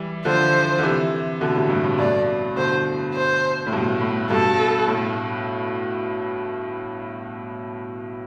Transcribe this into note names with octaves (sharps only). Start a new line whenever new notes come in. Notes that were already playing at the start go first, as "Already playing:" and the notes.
Already playing: E3 G3
D3 F3 C5
D3
C3 E3
B2 D3
A2 C3
G2 B2
A2 C3
G2 B2 D5
B2 D3 C5
C5
A2
G2 B2
A2
G2 B2 A4
A2